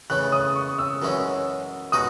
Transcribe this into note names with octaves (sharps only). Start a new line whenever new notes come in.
C#3 E3 A3 F#6
D#6
C#6
E6
F#2 E3 G#3 C#4
B2 G#3 D#4 F#4 D#6